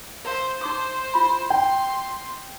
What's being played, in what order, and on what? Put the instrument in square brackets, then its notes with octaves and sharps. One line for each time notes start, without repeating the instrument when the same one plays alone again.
[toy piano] A#4 F5 [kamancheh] C5
[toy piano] D#4 D6 D#6 [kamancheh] C5
[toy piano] E4 F4 B5
[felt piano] G5 [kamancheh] C6